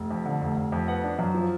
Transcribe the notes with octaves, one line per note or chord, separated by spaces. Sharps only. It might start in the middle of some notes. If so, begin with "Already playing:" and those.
Already playing: F1
F2
D3
F1
F1
F2
B3 F#5
D4
F#2
F3